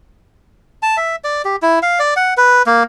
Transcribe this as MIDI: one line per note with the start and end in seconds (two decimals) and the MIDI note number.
0.82 0.97 81
0.97 1.16 76
1.24 1.42 74
1.45 1.56 67
1.62 1.79 64
1.82 1.99 77
1.99 2.14 74
2.16 2.34 78
2.37 2.62 71
2.66 2.83 58